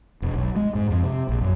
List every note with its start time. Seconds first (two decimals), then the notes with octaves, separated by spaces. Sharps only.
0.22 E1
0.35 B1
0.56 G#3
0.75 G#2
0.90 F2
1.03 C3
1.29 A#1
1.41 F#2